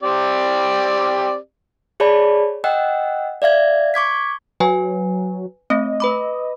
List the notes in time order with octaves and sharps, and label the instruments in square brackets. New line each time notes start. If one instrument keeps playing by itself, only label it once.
[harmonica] C4 G4 D5
[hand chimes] G#4 C#5 D5 A5 B5
D#5 F#5 G5 E6 F#6
D5 E5 F5 G#6
C#6 D6 G#6 B6
[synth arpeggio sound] F#3 [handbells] B4 G#5
[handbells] A3 C4 [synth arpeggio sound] D#5
[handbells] B4 B5 D6